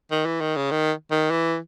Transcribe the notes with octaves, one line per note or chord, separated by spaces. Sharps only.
D#3
E3
D#3
C#3
D#3
D#3
E3